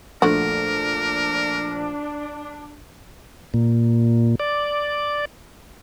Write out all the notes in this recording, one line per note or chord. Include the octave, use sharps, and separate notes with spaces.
A#1 D3 A3 D4 F#4 A#4
A#2
D5